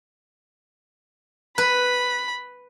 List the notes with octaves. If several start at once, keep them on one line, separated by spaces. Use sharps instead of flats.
B4 B5